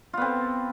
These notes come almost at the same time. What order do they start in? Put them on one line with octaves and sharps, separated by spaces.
F4 B3 C4